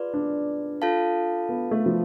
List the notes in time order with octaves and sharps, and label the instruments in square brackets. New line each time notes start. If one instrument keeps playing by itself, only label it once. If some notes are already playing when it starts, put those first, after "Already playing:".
Already playing: [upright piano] F4 [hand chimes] G#4 B4 D5
[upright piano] D4
[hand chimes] F4 A4 F5 A5
[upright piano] B3
A3
F3